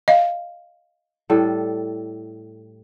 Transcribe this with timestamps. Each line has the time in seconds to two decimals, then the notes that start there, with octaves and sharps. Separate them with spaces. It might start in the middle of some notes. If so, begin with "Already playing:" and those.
0.08 D#5 F5
1.30 A2 G3 A4